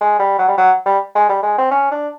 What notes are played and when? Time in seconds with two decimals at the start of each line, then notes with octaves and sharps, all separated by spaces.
0.01 G#3
0.19 G3
0.38 F#3
0.48 G3
0.58 F#3
0.86 G3
1.15 G#3
1.29 G3
1.43 G#3
1.58 C4
1.71 C#4
1.91 D4